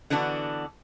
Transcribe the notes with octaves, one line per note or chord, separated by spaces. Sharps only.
D3 E3 B3 D4 F#4